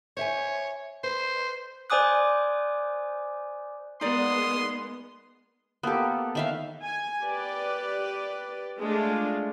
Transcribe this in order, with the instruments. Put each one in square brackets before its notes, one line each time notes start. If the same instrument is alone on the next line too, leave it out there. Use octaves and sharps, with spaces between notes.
[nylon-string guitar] C5 E5 G#5 [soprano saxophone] C#5
[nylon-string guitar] B4 [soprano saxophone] C5
[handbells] C5 D5 G#5 D6 D#6 F#6
[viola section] G#3 A#3 B3 [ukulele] D#4 D5 [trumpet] C6 [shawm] D#6
[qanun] A#3 G4 [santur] B3 A4
[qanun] D#3 E5 F5
[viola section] G#5
G4 B4 D5
G#3 A3 D4 F4